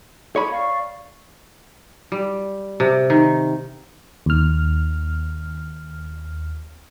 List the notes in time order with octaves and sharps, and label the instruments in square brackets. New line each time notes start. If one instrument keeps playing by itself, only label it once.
[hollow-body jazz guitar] C#5 B5
[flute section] D5 F5 C#6
[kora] G3
C3
D#3
[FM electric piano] D#2 F6